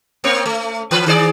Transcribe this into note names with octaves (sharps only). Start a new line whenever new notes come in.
A#3 C4 C#5
A3
E3 B4
D#3 G#4 D5